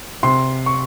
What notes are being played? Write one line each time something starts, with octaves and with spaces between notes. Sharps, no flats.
C3 C6
C#6